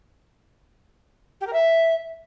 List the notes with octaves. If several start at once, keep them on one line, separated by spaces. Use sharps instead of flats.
G4
A#4
E5